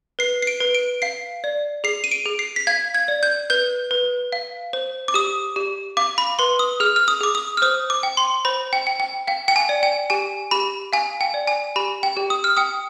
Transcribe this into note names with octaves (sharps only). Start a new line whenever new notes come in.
B4 C7
C7
D7
B4
D7
F5 C7
D5
G#4 C7
D#7
D7
G#4
C7
B6
F5 G#6
G#6
D5
G6
B4 G6
B4
F5
C5
D6
G4 D#6
G4
F5 D6
B5
B4 C6
D#6
G#4 F6
F6
D#6
G#4 D6
D#6
F6
C5 D#6
D6
G5
C6
C5 B5
G5
G5
G5
F5 G5
G5
G#5
D5
G5
G4 G#5
G4 B5
F5 G#5
G5
D5
G#5
G4 B5
G5
G4
D#6
F6
G5 D#6